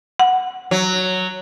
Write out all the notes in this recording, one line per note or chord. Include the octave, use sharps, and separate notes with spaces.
F#5
F#3